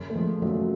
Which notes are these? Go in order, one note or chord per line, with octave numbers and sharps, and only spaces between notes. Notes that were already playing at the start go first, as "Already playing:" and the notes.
Already playing: F#2 C#3
A3
F3 G#3
F#2 C#3 F#3 A3